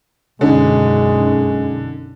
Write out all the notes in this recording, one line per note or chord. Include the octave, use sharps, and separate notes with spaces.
B1 F#2 D3 G#3 C#4 D#4